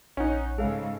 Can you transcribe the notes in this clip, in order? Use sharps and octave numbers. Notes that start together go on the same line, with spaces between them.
A#1 C#4 D#4 C#5 F#5 F#6
G#2 C#3 G#3 G#4 A4 F5